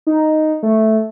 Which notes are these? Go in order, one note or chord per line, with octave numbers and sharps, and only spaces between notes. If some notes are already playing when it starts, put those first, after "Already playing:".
D#4
A3